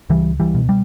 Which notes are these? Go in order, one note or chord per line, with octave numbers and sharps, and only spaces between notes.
C#2 E3 G3
E3 G3
B2
G3